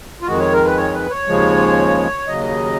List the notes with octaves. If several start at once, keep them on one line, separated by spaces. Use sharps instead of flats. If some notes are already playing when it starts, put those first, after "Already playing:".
F4
F2 D#3 G#3 F#4
C#5
A#4
B4
C#5
B4
C#5
D#2 C#3 F3 G#3
D#2 C#3 F#3 D#5